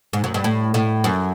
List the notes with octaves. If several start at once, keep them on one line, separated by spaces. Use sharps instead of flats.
G#2
F#2
G2
A2
A2
F#2